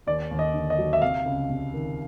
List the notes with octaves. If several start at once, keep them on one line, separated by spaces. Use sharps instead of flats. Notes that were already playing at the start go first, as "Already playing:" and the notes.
D#2 D5
D#2
D#5
D3
D#5
F#3
E5
C3 F5
C#2
C3
D#3